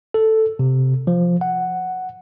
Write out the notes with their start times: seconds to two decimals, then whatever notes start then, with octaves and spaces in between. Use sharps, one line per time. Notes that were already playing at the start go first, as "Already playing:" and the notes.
0.14 A4
0.59 C3
1.07 F3
1.41 F#5